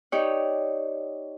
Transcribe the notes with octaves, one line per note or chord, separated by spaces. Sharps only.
D#4 G4 C#5 D5